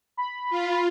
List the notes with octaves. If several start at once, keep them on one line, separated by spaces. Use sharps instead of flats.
B5
F4